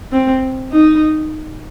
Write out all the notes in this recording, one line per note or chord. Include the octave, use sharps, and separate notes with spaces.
C4
D#4